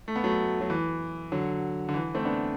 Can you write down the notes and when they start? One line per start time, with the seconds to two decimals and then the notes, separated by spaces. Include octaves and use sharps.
0.08 A3
0.16 B3
0.24 F#3 A3
0.61 F#3
0.70 E3
1.32 D3 F#3
1.89 D3
1.94 E3
2.15 A3 C4
2.25 B3 D4